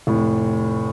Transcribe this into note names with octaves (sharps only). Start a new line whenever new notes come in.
F1 A2